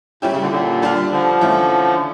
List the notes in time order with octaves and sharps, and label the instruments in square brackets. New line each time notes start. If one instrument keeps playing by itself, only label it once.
[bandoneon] A#2 [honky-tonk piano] G3 C#4 E4 G4
[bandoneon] C#3
A#2 D3
A#2 D3
[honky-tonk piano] G3 D4 F4
[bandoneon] D3 F3
[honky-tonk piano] E3 A3 C#4